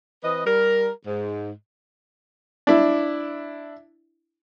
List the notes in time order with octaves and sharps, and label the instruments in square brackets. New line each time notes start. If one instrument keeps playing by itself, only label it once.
[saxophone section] E3 C4 B4 D#5
G3 A#4
G#2
[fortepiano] D4 E4